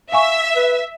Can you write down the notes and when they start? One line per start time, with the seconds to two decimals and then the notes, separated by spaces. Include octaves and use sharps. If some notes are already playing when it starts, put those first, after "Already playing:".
0.12 E5 F5 G#5 C#6
0.56 B4